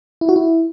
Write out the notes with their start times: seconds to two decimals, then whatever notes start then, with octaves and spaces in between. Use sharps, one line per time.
0.21 E4
0.29 F#4
0.36 E4